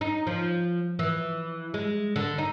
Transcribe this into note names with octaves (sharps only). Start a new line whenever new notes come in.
D#4
F3
E3
G#3
D3
D#4